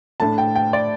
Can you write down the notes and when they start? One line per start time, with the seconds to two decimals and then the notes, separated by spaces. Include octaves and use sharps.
0.20 A2 A3 D4 A5
0.38 G5
0.55 G5
0.73 D5